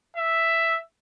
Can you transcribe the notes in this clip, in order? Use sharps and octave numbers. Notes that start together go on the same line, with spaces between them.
E5